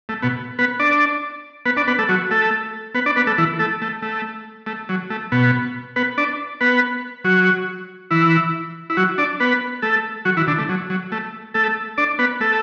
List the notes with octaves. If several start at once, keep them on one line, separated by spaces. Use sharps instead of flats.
A3
B2 B3
B3 B4
D4 D5
B3 B4
D4 D5
B3 B4
A3 A4
F#3 F#4
A3 A4
B3 B4
D4 D5
B3 B4
A3 A4
E3 E4
A3 A4
A3
A3
A3
F#3
A3
B2 B3
B3 B4
D4 D5
B3 B4
F#3 F#4
E3 E4
E4
F#3 F#4
D4 D5
B3 B4
A3 A4
F#3 F#4
E3 E4
D3 D4
A3
F#3
F#3
A3
A3 A4
D4 D5
B3 B4
A3 A4